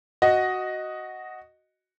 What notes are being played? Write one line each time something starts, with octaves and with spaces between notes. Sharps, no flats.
F#4 D#5